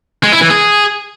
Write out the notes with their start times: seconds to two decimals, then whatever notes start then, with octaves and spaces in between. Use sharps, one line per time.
0.23 G#3
0.32 E4
0.41 E3
0.50 G#4